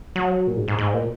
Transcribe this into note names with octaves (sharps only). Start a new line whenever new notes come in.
F#3
A#2
G#2
G#2
G#2
A#2